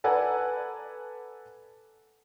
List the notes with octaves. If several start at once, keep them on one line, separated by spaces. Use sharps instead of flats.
A4 B4 D5 F#5 G#5 A#5